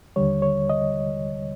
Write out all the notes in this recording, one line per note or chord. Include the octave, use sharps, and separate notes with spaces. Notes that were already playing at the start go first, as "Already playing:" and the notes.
D#2 D3 G3 C#5
C#5
D#5